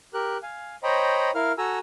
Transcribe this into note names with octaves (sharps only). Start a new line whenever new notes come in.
G4 A#4 F#6
F5 G#5
C5 C#5 D#5 G5 A#5 B5
E4 A#4 F5 F6
F#4 A4 G#5 A#5 E6